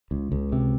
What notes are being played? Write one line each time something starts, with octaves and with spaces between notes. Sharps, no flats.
C#2
C#2
C3